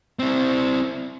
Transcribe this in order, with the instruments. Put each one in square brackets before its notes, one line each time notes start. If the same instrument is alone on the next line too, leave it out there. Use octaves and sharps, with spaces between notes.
[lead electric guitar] C4 E4